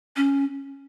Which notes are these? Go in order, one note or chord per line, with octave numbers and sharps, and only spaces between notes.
C#4